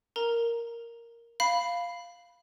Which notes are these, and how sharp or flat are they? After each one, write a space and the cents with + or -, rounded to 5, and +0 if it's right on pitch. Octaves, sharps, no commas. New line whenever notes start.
A#4 +0 A#5 +0
F5 +0 B5 +0